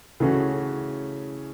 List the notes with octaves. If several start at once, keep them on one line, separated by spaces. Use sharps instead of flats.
C#3 E3 A3 C#4 F#4